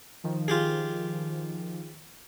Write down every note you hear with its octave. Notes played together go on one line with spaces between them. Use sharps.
D#3 F3
F4 G4 G#4